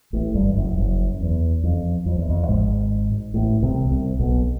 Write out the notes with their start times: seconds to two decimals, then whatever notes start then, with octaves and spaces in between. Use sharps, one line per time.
0.13 A1 A2
0.34 G1 G2
0.56 F#1 F#2
0.77 F#1 F#2
1.21 E2
1.64 F2
2.06 F2
2.18 E2
2.30 F2
2.48 G#1 G#2
3.34 A1 A2
3.62 C2 C3
3.90 C2 C3
4.19 B1 B2